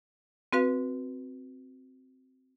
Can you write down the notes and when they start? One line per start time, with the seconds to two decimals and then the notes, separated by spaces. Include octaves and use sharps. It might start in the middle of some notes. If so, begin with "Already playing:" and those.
0.53 C4 F#4 B4 F5